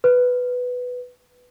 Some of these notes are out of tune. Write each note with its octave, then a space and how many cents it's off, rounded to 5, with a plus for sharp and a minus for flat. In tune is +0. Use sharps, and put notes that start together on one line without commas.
B4 +5